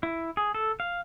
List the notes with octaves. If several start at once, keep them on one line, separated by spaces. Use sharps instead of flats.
E4
G#4
A4
F5